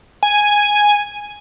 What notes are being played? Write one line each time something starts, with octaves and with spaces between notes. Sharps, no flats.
G#5